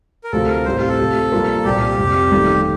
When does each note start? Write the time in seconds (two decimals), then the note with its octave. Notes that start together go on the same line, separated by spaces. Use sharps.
0.24 A#4
0.32 D2 C3 F3 A3 A4
0.50 A#4
0.65 A1 A2 G3 C4 C5
0.77 F4
0.88 A4
0.99 C3 F3 A3
1.32 G2 F3 A#3 F4 A#4
1.65 C2 A#2 F3 G4
1.98 F2 C3 G3
2.31 G1 G2 D#3 A3